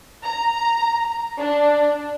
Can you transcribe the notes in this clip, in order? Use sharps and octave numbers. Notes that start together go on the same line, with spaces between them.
A#5
D4